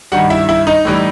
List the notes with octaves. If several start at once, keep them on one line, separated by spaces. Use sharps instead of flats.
G2 D#3 G3 F#4 F#5
E4 E5
E4 E5
D#4 D#5
A2 E3 G3